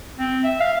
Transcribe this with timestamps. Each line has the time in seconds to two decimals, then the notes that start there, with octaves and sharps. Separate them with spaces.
0.19 C4
0.44 E5
0.61 F5